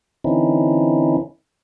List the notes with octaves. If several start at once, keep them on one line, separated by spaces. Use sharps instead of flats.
D3 E3 C4 C#4 D#4 E4